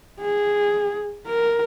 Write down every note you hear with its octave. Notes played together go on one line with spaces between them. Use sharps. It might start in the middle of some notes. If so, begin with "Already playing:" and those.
G#4
A#4